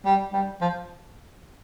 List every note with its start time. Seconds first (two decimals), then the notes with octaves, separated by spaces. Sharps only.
0.05 G3
0.33 G3
0.61 F3